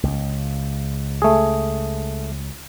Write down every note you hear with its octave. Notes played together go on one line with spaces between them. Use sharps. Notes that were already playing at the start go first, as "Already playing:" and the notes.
C#2
A3 G#4